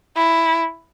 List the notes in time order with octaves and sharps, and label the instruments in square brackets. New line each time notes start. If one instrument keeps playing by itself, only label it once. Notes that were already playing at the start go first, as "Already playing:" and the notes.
[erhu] E4